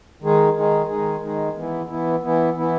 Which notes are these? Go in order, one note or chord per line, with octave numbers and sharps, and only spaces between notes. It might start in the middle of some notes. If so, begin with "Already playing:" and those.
D#3 G#3 D#4 G#4
D#3 G#3 D#4 G#4
D#3 G#3 D#4 G#4
D#3 G#3 D#4 G#4
E3 B3 E4
E3 B3 E4
E3 B3 E4
E3 B3 E4